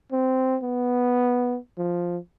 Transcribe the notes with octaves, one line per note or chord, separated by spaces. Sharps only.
C4
B3
F3